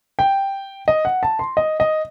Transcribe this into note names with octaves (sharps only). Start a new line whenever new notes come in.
G5
D#5
F#5
A5
C6
D#5
D#5